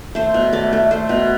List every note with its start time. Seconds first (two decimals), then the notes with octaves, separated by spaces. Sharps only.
0.15 A3 C5
0.34 B2
0.53 A3 D5
0.73 A3
0.91 A3 C5
1.09 B2